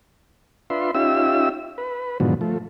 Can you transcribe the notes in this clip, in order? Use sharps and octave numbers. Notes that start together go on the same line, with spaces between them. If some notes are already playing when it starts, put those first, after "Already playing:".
D4 F4 B4 E5 C6
C#4 D#4 F4 G4 E5 E6
B4
G#2 B2 D3 D#3 F3 F#3
F3 A3